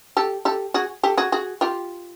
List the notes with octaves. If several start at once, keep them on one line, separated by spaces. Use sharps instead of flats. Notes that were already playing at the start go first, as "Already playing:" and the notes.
G4 A4
G4 A4
F#4 G#4
G4 A4
F#4 G#4
F#4 G#4
F4 G4